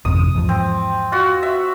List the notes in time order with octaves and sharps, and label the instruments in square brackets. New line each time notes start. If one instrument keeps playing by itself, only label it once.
[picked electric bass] G#1 F2 C3 [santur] D#6
[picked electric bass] E2 G#2 F3
[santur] C4
F4 F#4
E5